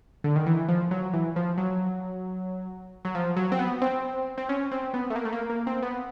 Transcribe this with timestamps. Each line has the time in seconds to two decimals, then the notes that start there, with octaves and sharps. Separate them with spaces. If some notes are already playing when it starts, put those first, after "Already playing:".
0.24 D3
0.36 D#3
0.46 E3
0.69 F3
0.91 F#3
1.14 E3
1.36 F3
1.58 F#3
3.05 F#3
3.15 F3
3.37 F#3
3.52 C4
3.59 B3
3.82 C4
4.38 C4
4.49 C#4
4.71 C4
4.94 B3
5.10 A3
5.16 A#3
5.25 A3
5.33 A#3
5.50 A#3
5.67 C4
5.82 B3